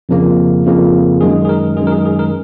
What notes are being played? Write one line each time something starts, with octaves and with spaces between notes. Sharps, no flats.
F2 C#3 F3 A#3
F2 C#3 F3 A#3
F#2 D#3 G#3 G#4
G#4
A#4
F#2 D#3 G#3 G#4
A#4
G#4
G#4
A#4